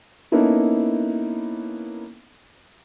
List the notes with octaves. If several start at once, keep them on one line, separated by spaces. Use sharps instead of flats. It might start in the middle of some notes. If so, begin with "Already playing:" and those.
A#3 B3 C#4 D#4 E4 A4